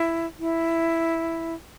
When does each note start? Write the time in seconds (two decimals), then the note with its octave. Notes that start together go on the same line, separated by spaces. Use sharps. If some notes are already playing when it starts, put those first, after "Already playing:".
Already playing: E4
0.39 E4